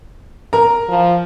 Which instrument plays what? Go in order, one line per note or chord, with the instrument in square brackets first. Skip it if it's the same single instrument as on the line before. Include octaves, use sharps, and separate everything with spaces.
[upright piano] A#4 A#5
[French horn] F3